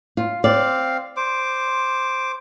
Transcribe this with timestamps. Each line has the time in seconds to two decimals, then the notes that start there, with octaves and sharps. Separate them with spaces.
0.17 F4
0.44 C4 D5 F5
1.17 C5 D6